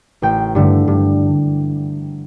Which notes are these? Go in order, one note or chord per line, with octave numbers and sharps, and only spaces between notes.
A1 G5
G2 D3 A3
G2